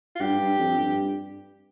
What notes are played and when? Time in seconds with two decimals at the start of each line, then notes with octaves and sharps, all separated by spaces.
0.15 F4
0.20 G2 G4
0.39 G2
0.59 F2
0.78 G2